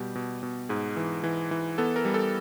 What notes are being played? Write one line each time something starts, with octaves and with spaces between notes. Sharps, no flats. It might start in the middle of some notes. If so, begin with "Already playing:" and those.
Already playing: B2 G3 G4
B2
B2
G#2 G#4
E3
E3
E3
B3 A4
A#4
G3
A4